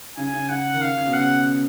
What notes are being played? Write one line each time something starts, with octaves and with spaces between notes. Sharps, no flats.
C#3 G#5
C#3
C#3 F#5
D#3
C#3 F5
C#3
B2
C#3 F#5